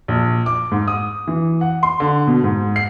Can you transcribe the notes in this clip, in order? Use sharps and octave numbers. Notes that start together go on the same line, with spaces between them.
A#1
D6
G#2
D#6
E3
F#5
C6
D3
B2
G#2
C7